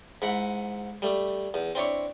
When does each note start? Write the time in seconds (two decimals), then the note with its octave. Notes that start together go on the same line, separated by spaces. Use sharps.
0.22 G#2 E4 F#5
1.02 G3 A3
1.54 E2
1.75 C4 D4 E4 C#5